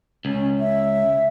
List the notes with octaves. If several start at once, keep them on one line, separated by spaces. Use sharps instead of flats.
C#2 C#4
E5